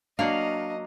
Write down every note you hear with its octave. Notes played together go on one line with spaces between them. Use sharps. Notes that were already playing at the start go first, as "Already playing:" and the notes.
F#3 A#3 D4 D#5 F5